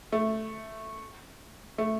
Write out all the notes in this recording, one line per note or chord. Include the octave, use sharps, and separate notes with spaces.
A3
A3